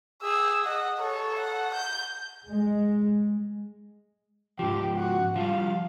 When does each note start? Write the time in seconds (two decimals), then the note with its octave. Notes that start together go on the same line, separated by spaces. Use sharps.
0.22 G#4 E6
0.65 D#5 F#5
0.99 A4 C#5
1.40 F#5
1.74 G6
2.47 G#3
4.59 G#2 F3 G4
4.96 F#4
5.36 F3 G3 F5